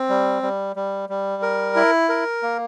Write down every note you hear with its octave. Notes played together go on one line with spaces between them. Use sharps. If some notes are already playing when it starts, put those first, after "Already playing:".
Already playing: C4
G3
G3
G3
G3
A#4
E4
A#4
A#3